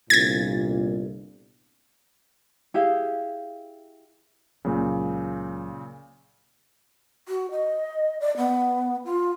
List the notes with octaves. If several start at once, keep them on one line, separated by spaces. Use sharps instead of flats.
G1 C2 A#2 G#6 A6
E4 G4 G#4 F5
C#2 A#2 C#3 F#3 A#3
F#4
D#5
D5
B3
F4